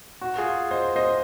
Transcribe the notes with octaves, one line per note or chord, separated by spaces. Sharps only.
F#4
F4 G#4
C5 D#5
C5 D#5